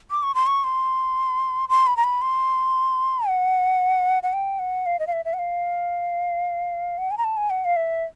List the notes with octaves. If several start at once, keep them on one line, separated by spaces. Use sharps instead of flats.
D6
C#6
C6
C#6
C6
C6
B5
A#5
B5
C6
F#5
F#5
G5
F#5
F5
D#5
F5
E5
E5
F#5
F5
F#5
G#5
A#5
A5
G#5
F#5
F5
E5